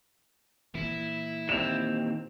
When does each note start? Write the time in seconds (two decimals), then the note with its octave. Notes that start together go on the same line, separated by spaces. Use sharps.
0.75 A#2 E3 E4
1.49 D#2 C4 E7 F7